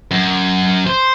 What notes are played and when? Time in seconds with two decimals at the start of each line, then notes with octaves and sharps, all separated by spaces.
0.11 F#2
0.87 C5